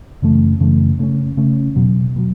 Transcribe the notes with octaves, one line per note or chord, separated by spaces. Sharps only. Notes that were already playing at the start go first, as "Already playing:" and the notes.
F#2 C#3 E3 A3
F#2 C#3 E3 A3
C#3 A3 C#4
C#3 A3 C#4
E2 B2 F#3
B2 F#3